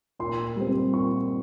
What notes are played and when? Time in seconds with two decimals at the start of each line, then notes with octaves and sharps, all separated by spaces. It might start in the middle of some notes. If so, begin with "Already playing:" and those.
0.19 A#2 C6
0.56 G3 C4
0.93 A#2 C#6